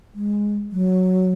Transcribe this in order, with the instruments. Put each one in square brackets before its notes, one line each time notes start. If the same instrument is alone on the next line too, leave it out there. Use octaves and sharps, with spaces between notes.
[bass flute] G#3
F#3